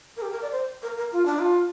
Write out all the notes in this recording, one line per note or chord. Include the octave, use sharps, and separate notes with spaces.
A#4
G4
A#4
D5
C5
A#4
A#4
F4
D4
F4